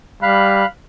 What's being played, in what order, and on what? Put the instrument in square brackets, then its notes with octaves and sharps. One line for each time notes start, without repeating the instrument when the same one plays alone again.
[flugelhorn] G3 [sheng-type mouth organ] F5 B5 F#6